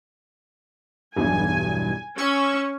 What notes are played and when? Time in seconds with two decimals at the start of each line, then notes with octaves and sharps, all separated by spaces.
1.16 B1 E2 G2 G#5
2.18 C#4 C#6 E6 G#6